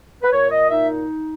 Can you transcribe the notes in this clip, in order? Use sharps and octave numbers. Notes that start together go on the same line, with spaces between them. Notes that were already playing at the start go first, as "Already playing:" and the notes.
B4
A#2 C#5
D#5
D#4 E5